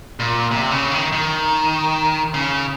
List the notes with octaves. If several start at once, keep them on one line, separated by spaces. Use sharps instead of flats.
A#2
C3
C#3
D#3
D#3
C#3